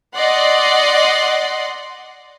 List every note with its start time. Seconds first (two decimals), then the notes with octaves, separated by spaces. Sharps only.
0.15 D5 D#5 F#5 C6